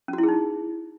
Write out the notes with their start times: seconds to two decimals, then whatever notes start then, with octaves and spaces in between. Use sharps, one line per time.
0.08 C#4
0.13 F#4
0.18 E4
0.23 G#4
0.28 D#4